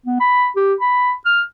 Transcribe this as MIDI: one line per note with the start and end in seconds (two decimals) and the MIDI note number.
0.06 0.18 59
0.20 0.48 83
0.56 0.74 67
0.80 1.13 83
1.25 1.41 89